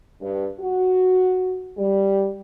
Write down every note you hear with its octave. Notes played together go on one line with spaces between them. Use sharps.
G2
F#4
G3